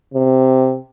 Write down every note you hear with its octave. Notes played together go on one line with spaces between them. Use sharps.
C3